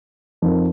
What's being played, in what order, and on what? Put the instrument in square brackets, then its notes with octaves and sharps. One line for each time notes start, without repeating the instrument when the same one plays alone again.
[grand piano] F2 F3 D#4 A#4